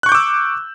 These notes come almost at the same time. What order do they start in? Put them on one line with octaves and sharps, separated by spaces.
F#6 C#6 G6 D6 E6